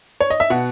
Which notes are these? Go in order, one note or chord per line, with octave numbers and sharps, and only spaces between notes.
C#5
D#5
E5
B2 F#5